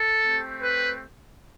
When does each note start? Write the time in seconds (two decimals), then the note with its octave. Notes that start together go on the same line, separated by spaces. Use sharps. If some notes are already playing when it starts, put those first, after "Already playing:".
Already playing: A4
0.23 A3 C4 G4
0.63 B4